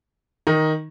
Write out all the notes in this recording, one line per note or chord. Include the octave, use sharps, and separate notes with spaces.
D#3 D#4